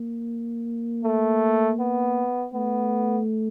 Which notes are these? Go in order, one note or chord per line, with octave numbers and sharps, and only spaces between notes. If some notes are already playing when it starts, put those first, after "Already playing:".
Already playing: A#3
A3
B3
A3 B3